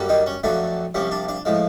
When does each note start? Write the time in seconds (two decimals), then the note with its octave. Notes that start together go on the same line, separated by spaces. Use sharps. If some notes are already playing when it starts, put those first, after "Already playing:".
Already playing: F#2 D3 G3 A#3
0.09 D#3 D#4
0.26 C#4
0.44 F2 D3 F#3 A3 D4
0.94 C2 C3 F3 C#4
1.11 D4
1.28 D4
1.45 A2 F3 G#3